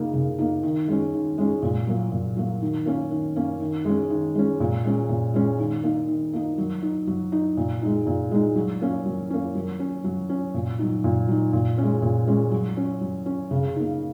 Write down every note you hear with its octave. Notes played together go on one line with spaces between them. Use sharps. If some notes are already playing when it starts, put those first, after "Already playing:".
Already playing: C#3 A#3 D#4
C#3
A#3 D#4
D#3
G#3 C#4
D#3
G#3 C#4
A#2
F#3 A#3
A#2
F#3 A#3
D#3
A#3 C#4
D#3
A#3 C#4
D#3
G#3 C#4
D#3
G#3 C#4
A#2
G#3 C#4
A#2
G#3 C#4
D#3
A#3 D#4
D#3
A#3 D#4
F#3
D#4
F#3
D#4
A#2
G#3 D#4
A#2
G#3 D#4
F#3
A#3 C#4
F#3
A#3 C#4
F#3
C#4
F#3
C#4
A#2
F#3 D#4
A#2
F#3 D#4
A#2
G#3 C#4
A#2
G#3 C#4
F#3
C#4
F#3
C#4
C#3
A#3 D#4